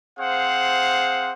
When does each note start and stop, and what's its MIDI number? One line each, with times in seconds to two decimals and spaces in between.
0.19 1.33 60
0.19 1.33 68
0.19 1.33 72
0.19 1.33 77
0.19 1.33 78